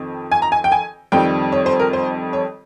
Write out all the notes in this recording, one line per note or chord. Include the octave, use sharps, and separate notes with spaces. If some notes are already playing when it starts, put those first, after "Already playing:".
Already playing: F2 D#3 C4
G#5
A#5
G#5
G5
G#5
F2 D#3 G3 C4 G5
C#5
C5
A#4
C5
C#5